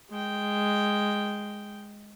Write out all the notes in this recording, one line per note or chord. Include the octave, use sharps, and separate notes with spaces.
G#3 G5